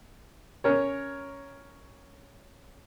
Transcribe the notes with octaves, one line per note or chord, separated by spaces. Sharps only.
C#4 A#4 C#5